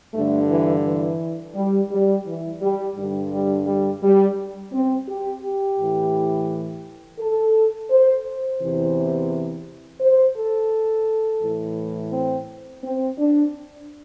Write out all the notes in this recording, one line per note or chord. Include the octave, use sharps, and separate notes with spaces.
G2 D3 A3
E3
E3
G3
G3
E3
G3
G2 D3 G3
G3
G3
G3
C4
G4
G4
A2 E3
A4
C5
C5
E2 C3 E3
C5
A4
A2 E3
C4
C4
D4